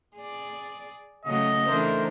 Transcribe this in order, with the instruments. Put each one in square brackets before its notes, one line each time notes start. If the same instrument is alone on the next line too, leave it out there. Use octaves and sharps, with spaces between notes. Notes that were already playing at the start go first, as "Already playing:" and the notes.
[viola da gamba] G#4 D5
[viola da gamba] C#3 F#3 A3 [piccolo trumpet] D#5
[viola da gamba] E3 D4 D#4 [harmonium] A3 A#4 C5